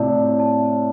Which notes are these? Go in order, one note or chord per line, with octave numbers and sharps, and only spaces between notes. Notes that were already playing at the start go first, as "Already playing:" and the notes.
Already playing: A2 C3 E4 D5 A5
D5
A5